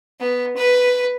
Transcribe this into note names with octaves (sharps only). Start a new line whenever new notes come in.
B3
B4